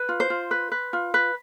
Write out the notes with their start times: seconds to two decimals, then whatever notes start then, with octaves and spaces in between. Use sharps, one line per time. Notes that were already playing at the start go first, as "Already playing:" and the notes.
Already playing: B4
0.09 F4
0.20 C5
0.30 F4
0.51 B4
0.72 B4
0.93 F4
1.14 B4